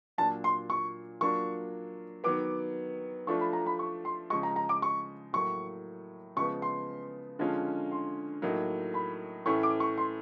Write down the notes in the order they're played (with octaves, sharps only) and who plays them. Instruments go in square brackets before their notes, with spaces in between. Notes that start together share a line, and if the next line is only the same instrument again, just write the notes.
[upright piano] A#2 F#3 A#3 D4 F4 [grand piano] A5
[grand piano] C6
C#6
[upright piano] F#3 A#3 D4 F4 [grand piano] C#6
[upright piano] D#3 F#3 B3 [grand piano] D6
[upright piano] F3 A3 D4 F4 [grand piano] C#6
[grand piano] B5
A#5
B5
C#6
C6
[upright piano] C#3 F3 G#3 [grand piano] C#6
[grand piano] A#5
A#5
D6
C#6
[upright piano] A2 F#3 A#3 [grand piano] C#6
[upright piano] C#3 F3 G#3 B3 [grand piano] C#6
[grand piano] C6
[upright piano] D3 F3 G#3 C#4 F4
[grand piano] C6
[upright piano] A2 F#3 A#3 D#4
[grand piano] B5
[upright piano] A2 E3 A3 C#4 E4 [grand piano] C#6
[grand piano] D6
C#6
C6